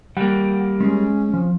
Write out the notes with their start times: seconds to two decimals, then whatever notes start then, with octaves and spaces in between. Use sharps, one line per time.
0.17 G3 A#3 F#5 G5
0.80 G#3 C#4 G#4
1.34 F3